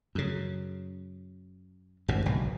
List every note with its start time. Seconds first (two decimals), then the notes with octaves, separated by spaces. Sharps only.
0.15 F#2 C#3
2.08 G#1 G2 C3
2.26 F#1 B1 B2